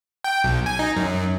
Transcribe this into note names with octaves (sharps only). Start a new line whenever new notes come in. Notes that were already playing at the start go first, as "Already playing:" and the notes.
G5
B1
G#5
D#4
F#2